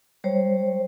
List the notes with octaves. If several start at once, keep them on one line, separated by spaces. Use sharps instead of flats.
G3 C5 C#5